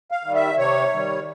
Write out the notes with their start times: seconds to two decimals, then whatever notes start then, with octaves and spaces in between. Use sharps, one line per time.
0.11 F5
0.23 D#3 G3
0.35 E5
0.58 C3 C#5
0.92 D#3 G3